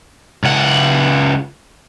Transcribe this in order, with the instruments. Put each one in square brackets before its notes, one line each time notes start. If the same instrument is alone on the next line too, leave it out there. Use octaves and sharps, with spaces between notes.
[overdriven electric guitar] C#2 F#5